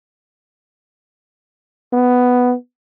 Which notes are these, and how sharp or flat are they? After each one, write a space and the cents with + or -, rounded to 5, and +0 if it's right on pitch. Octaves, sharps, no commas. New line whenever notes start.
B3 +5